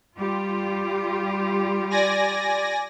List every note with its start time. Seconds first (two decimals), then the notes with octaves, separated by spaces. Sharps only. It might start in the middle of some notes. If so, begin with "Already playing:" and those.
0.17 G3 F4 G4
1.90 D5 G#5 A#6